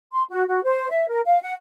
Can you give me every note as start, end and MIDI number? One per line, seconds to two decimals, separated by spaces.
0.13 0.23 84
0.30 0.43 66
0.48 0.63 66
0.64 0.89 72
0.91 1.08 76
1.09 1.21 70
1.25 1.40 77
1.42 1.54 78